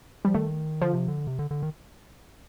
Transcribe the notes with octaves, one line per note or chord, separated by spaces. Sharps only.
F3 G3
D#3 A3
D3 F3
C3
D3
C3
D3
D3
D#3